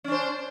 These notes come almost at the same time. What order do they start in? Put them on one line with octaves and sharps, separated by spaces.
C#4 D4 C5